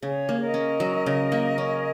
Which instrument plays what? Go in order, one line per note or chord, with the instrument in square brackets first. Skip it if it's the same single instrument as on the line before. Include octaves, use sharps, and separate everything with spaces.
[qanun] C#3 [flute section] G#4 C#5
[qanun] A#3
[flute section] A#4 D#5
[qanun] C#4
F#3
C#3
A#3
C#4